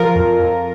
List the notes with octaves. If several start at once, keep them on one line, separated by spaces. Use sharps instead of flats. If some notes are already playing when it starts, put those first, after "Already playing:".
Already playing: F3 F4 A#4
F2
F2